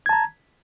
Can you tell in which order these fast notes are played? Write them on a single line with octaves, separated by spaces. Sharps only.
G#6 A5 A#5